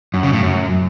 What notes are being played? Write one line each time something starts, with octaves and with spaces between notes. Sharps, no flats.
F#2
C#3
A2
F#2